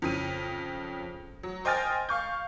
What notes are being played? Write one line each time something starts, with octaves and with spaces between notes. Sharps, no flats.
F2 C#3 D#7
F#3
C5 D#5 G5 G#5 F6 A6
F5 C#6 G6